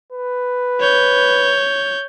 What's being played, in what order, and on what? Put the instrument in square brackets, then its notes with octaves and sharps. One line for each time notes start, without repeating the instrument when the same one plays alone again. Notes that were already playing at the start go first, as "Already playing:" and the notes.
[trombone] B4
[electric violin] C#5 G6